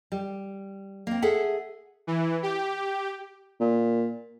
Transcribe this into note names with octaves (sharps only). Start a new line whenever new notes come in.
G3
A#3 C4
G#4 A4 E5 F#5
E3
G4
A#2